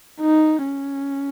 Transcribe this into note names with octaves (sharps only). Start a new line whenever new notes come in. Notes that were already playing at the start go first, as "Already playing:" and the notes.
D#4
C#4